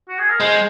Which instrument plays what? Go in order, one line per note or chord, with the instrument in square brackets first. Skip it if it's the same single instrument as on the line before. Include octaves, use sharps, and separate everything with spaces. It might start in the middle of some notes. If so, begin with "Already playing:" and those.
[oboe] F#4
G#4
A#4
[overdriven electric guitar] G#3 [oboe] C5